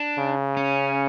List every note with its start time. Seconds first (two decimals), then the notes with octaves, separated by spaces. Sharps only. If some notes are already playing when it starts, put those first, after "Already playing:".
Already playing: D4
0.18 C#3
0.57 C#4